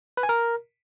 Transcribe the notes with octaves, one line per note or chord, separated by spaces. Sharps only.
B4
G#5
A#4